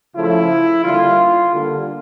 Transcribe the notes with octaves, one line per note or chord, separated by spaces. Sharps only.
C#3 F3 A3 E4
D3 G3 A#3 F4
D3 G3 A#3